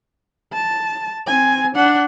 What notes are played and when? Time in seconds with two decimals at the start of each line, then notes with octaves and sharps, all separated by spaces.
0.53 A5
1.27 C4 G#5
1.74 D4 F#5